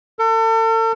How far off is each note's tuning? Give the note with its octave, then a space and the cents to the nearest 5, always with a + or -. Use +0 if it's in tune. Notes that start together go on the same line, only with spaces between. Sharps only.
A4 +40